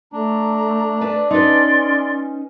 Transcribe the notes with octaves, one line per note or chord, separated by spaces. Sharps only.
A3 D4 A#5
B4 D5 A5
C#4 D#4 B4 D5 C6